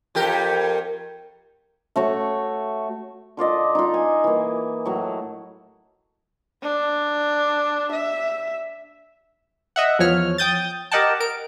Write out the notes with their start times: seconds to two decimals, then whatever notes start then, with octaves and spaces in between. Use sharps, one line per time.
0.15 F2 G4 A#4
1.96 A3 F#4 C#5
3.37 D3 F4 D5 D#5
3.75 D#4 F4
3.94 G#5
4.24 E3 A#3
4.86 A2 F#3
6.62 D4
7.92 E5
9.76 D#5 E5 F#5
9.99 E2 F3 C#5 F6
10.38 G5 D#6 G6 A6
10.91 G4 A#4 D#5 F#5 G5 A5
11.20 A#4 D7